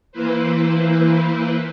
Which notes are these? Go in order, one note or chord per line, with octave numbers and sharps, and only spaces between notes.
E3 A#3 E4 B4 C5